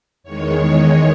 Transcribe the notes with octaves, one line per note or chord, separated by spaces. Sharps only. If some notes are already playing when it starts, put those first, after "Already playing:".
E2 D#3 G#3 C#5